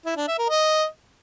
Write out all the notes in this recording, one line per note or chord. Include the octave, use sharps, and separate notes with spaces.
E4
D4
E5
A#4
D#5